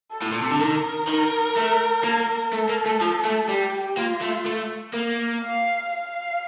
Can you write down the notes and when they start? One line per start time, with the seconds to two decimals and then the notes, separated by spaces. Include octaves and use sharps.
0.12 A4
0.22 A2
0.32 A#2
0.42 C3
0.51 D3
0.60 D#3 A#4
1.09 D#3
1.56 A3
2.04 A#3
2.53 A3 A4
2.69 A#3
2.86 A3
3.01 F3
3.25 A3
3.49 G3 G4
3.98 A#3 F4
4.22 A3
4.46 A3
4.94 A#3
5.43 F5
5.90 F5